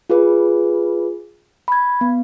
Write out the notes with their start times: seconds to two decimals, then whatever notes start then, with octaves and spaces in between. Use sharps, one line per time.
0.10 F4 G#4 B4
1.68 B5 G#6
2.01 B3